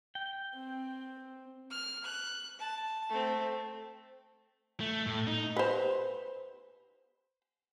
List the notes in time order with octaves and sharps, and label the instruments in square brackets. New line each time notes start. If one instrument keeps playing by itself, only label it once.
[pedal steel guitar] G5
[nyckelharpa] C4
[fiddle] F6
F#6
A5
A3 C4
[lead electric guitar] A3
A2
D#4
[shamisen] B4 C5